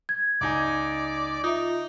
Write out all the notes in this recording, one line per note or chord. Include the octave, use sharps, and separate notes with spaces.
G#6
C#2 D#4 D5 G#5 G#6
D#4 F4 E5